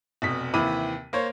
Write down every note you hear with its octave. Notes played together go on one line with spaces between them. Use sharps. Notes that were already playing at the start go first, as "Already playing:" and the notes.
F1 B2 B6
D#2 C3 E3 B5 D6 D#7
A#3 C5 C#5